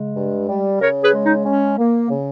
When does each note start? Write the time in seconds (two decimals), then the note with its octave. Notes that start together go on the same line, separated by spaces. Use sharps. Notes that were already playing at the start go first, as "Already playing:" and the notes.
Already playing: C#3 G#3
0.17 G2
0.49 G3
0.81 C#3 A#4 C#5
1.03 G#4 B4
1.14 G#3
1.24 D#4
1.46 C#4
1.78 A#3
2.10 C#3